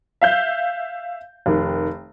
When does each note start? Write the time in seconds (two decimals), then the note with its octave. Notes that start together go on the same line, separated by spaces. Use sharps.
0.22 E5 F5 G6
1.46 F1 D#3